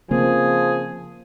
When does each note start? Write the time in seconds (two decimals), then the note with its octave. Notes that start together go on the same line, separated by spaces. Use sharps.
0.11 C#3 F3 A#3 C4 G#4